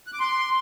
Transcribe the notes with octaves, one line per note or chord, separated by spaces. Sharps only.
F#6
D6
C6